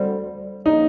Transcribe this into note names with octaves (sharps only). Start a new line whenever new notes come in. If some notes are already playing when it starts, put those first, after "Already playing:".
Already playing: D2 D3 G3 C4
C#3 F3 A#3 D#4